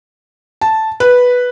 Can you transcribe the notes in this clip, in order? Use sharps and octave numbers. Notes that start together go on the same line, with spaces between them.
A5
B4